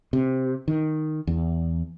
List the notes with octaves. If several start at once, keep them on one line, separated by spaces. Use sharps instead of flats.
C3
D#3
E2